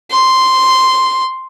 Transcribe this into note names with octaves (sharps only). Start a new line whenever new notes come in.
C6